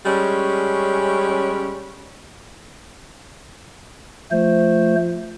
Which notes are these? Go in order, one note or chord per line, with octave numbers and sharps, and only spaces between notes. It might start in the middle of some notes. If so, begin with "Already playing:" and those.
G3 G#3 C#4
F3 A3 C5